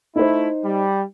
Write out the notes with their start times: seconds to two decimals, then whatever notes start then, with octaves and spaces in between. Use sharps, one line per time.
0.16 A3 D#4 E4 C5
0.64 G3